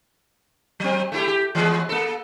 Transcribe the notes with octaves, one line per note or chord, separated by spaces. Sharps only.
F#3 C4
A3 E4 G4
G4
E3 G#3 B3
A#3 A4